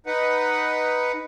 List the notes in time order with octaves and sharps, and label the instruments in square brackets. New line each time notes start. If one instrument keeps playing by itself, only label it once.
[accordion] D#4 B4 F#5